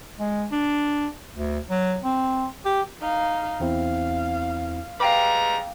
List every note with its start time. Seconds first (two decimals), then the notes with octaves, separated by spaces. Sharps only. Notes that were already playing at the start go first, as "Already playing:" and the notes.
0.20 G#3
0.52 D4
1.34 D2
1.70 F#3
2.04 C4
2.66 G4
3.02 D#4 F5
3.60 E2 C4 E4 F5
5.00 G3 G#3 B4 F5 G5 A#5 D6